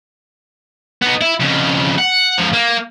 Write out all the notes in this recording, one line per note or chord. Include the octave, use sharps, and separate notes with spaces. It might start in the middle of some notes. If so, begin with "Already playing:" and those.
B3 D#4
E4
F2 C#3
F#5
G#2 F3
A#3